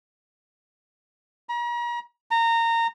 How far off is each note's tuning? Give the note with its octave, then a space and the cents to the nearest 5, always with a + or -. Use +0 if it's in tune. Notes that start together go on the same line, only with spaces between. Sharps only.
A#5 +40
A#5 -20